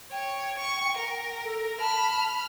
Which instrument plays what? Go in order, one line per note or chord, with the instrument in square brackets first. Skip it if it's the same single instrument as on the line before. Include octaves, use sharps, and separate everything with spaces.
[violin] C#5 [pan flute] G5
[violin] C#6
A#4
[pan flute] A4
[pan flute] A5 [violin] B5 F6